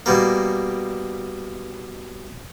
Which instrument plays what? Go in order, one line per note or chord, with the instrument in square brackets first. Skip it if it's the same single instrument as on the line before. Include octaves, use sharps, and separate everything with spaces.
[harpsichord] B2 G3 A#3